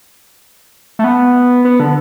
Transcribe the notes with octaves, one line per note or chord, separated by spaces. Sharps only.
A3
B3
B3
D3